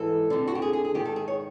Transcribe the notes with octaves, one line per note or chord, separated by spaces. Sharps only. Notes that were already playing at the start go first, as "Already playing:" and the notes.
Already playing: G#2 E3 A4
F2 D3
F#4
G4
G#4
G#4
G#4
G#2 D#3 G4
A4
G#4
C#5